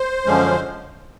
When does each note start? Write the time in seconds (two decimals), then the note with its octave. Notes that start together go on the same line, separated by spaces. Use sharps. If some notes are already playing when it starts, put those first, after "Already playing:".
Already playing: C5
0.26 F#2 D3 F3 G#3 C#4